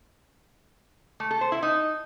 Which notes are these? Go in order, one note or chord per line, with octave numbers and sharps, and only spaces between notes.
A3
A4
C5
E4
D#4